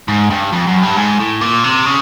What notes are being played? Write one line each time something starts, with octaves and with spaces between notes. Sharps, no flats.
G#2
G2
F2
F#2
G2
G#2
A2
A#2
C3
C#3